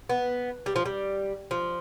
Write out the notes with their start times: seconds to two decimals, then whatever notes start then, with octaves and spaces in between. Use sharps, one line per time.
0.09 B3
0.66 G3
0.76 F3
0.86 G3
1.51 F3